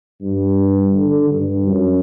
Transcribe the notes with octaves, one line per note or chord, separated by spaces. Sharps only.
G2
D3
G2
F#2